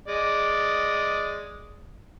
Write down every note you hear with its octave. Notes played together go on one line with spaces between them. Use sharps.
G#3 D5 D#5